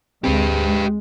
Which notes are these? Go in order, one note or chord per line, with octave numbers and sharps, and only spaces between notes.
D2 G#3 C4 G4 B4